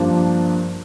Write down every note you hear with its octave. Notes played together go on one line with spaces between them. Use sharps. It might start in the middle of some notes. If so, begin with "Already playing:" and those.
Already playing: G2 F3 A#3 D4